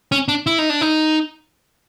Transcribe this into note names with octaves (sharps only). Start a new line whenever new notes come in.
C#4
D4
E4
D#4
D4
D#4